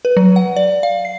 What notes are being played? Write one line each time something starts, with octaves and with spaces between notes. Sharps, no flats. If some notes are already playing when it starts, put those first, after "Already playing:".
B4
F#3
F#5
D5
F5
C7